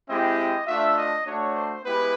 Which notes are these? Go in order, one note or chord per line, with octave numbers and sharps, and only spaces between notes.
G#3 C4 E4 G4 D#5
A3 D4 F4 E5
D#5
A3 D4 F#4 C#5
C5
G#3 B3 E4 G4 B4